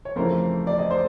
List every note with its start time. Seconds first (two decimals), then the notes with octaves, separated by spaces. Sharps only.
0.05 C#5
0.16 F2 C#3 E3 A3 A#4 C5
0.67 D5
0.79 D#5
0.91 C5 D5